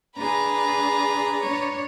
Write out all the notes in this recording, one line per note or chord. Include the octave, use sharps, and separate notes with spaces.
D4 G#4 B4 A#5
D4 C#5